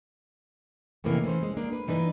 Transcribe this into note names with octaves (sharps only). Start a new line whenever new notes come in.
F2 A2 C3 E3 A#3 C#4
E3 C#4 C5
G#3
A#3 D4
B4
G2 E3 D4 D#4 B4